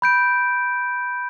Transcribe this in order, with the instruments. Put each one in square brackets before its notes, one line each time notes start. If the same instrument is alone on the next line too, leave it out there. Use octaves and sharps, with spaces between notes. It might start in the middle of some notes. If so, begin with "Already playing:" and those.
[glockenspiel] B5 G6 D7